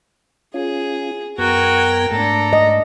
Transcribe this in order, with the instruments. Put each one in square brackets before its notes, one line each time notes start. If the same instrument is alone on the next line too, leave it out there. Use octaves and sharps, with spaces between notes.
[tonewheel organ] C#4 F4 [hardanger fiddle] G#4
[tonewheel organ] F#2 B3 G#6 [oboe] F#4 [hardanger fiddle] A#4 G5
[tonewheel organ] G#2 A3 [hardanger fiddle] D4 A4 [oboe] A#5
[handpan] D#5